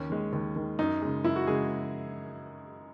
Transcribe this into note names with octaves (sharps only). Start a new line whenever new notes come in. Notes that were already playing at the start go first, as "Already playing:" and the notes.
Already playing: D#2 C#4
D#3 G#3
D#2
D#3 G#3
F#2 D#4
C#3 G#3
F#2 E4
F#4
C#3 G#3 G#4